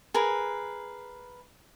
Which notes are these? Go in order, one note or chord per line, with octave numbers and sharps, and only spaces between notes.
G#4 A#4 B4